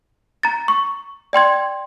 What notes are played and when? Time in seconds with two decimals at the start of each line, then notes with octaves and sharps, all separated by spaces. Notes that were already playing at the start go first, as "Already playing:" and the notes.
0.43 A#5 A6
0.68 C#6
1.33 D5 G5 C6 G#6